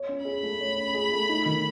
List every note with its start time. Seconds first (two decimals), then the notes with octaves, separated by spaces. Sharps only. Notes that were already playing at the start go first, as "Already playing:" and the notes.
Already playing: C#5
0.09 C#4
0.25 G#4 B5
0.43 A3
0.60 C#5
0.77 C#4
0.94 G#4
1.12 A3
1.29 D#4
1.46 D#3